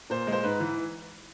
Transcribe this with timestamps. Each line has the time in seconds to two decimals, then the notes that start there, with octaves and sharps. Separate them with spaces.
0.10 A#2 C5
0.27 G#3
0.32 C5
0.43 G#2 B4
0.60 E3